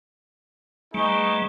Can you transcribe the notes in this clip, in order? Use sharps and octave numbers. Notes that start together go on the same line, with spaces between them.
G3 A3 B3 D#4 G#4 C#6